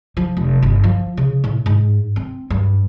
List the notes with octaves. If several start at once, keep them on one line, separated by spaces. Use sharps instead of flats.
F3
F1
G1
F3
C#3
A2
G#2
C4
G2